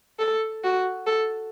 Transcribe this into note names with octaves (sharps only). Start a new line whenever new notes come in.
A4
F#4
A4